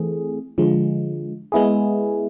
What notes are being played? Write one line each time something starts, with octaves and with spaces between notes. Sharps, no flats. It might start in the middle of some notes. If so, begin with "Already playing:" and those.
Already playing: E3 A3 C4 G#4
D3 F3 G#3
G#3 B3 E4 G#4